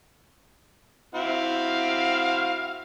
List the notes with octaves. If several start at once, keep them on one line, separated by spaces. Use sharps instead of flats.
C4 E4 F#4 F5